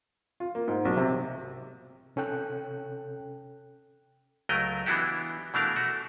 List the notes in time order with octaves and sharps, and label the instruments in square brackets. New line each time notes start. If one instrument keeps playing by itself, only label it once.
[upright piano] F4
A#3
G#2
B1
C3
[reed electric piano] C3 C#4 A4 G5 F#6
[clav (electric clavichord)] C#2 F#3 A3 A#4 D#5 G5
E3 B3 D4 E4 F#4 G4
B2 E3 A3 D4 A#4 F5
A3 F#4